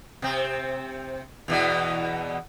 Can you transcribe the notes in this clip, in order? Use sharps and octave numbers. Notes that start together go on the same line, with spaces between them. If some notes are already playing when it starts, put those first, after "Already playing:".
C3 C4
E2 B2 E3